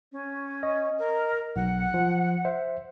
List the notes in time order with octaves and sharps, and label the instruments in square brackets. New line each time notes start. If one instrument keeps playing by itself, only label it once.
[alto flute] C#4
[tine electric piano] D#5
[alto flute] A#4
[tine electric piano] B1 [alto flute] F#5
[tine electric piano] F3
C5 E5